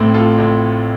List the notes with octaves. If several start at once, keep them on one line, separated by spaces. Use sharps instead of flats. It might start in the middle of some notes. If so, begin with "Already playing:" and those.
Already playing: A1 A2 A3 C4
F4 A4
A1 A2 A3 C4